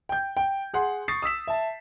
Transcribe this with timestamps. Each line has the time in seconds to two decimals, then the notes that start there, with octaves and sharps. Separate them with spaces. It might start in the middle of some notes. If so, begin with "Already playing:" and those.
0.09 G5 G6
0.37 G5
0.74 G#4 F#5 C6
1.08 C#6 D#6 A6 C7
1.22 D#6 E6 B6 E7
1.47 E5 A5